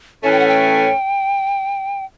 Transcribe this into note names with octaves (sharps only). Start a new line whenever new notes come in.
A2 E3 A3 C#4 G#5
G5
F#5
G5